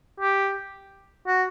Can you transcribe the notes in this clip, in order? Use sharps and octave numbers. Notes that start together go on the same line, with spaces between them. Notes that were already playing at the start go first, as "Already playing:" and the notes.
G4
F#4